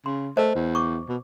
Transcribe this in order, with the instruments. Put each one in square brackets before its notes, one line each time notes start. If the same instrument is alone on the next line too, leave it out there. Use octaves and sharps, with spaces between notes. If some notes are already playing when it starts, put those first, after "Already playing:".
[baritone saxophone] C#3 [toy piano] C6
[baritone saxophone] A3 [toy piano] A#4 C5 D#5
[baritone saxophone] E2
[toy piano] C#6 D6
[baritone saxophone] B2